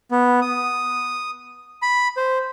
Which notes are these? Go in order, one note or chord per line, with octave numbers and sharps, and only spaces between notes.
B3
D#6
B5
C5